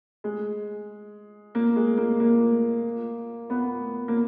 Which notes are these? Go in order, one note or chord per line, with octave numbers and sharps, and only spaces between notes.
G#3
A#3
G#3
A#3
A#3
B3
A#3